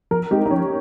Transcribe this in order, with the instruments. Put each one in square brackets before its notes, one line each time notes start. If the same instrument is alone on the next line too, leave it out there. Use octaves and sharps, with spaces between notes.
[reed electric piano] F3 [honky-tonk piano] A#4
[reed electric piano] G#3 C4 D#4 [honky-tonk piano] G4
[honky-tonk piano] D#4
[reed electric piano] F3 [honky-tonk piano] C#4